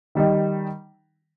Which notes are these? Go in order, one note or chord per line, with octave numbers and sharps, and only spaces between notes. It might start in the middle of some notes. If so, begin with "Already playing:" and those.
D#3 G3 D#4